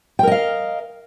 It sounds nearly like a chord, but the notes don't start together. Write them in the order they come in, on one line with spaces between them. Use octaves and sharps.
G5 A#4 D#5 F5